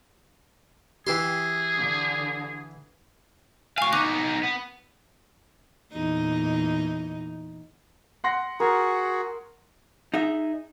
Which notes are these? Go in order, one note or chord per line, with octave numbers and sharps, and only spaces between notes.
E3 E4 G4 G#4 G5 C6
D3
D2 F5 G#5 C#6
B3 D#4 C#6 D6 F#6
B3
E2 A#2 D#4
F#5 C6 A#6
F#4 G#4 A#4
D#4 G#4 E5